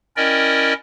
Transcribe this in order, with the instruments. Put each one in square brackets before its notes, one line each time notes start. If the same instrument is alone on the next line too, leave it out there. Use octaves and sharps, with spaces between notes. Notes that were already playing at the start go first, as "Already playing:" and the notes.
[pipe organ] C#4 E4 A#4 D5 D#5 G5